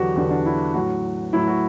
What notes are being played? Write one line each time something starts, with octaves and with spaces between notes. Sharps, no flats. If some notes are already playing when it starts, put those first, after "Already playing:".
Already playing: E2 D3 F#3 F#4 G4
E2 D3 F#3 G4
D4
E4
A2 F#3 F#4
A2 F#3 E4
F#4